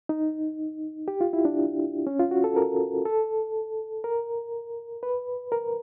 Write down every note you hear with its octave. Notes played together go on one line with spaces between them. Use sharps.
D#4
G4
F4
E4
D4
C#4
F4
F#4
A4
A#4
A4
A#4
B4
A#4